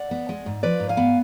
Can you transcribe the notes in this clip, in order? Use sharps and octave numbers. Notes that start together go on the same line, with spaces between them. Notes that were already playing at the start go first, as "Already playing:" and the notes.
Already playing: D5 F#5
B3
G#3
G#2
F3 B4 D5
G#2
F5 G#5
B3